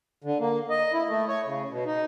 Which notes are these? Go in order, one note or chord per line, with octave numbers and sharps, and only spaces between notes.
D3
A#3
D#5
E4
A3
C#5
C#3
B2
D#4